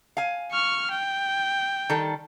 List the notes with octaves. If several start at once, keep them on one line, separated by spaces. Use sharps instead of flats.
F5 G#5
C#6 F6
G5
D#3 G3 A4